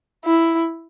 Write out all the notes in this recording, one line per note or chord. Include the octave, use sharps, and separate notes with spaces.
E4